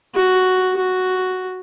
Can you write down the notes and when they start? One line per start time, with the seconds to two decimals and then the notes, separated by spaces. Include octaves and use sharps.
0.15 F#4
0.77 F#4